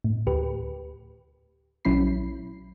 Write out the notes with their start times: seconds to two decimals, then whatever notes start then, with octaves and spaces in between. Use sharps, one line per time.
0.04 A2
0.27 D2 G4 B4
1.85 A#1 F#3 C#4 E4 B5 C7